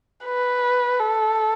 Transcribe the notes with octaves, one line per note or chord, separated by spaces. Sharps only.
B4
A4